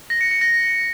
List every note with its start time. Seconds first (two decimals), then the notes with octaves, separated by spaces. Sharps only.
0.10 A#6
0.21 C#7
0.31 C#7
0.41 A#6